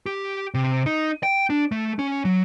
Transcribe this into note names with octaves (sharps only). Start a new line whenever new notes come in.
G4
C3
D#4
G5
D4
A3
C#4
F#3